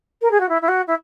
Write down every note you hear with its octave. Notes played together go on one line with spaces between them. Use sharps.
A#4
G#4
F#4
E4
E4
F#4
E4